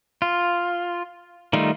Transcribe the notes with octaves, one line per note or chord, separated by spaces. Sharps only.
F4
D#3 G3 A3 D#4 F4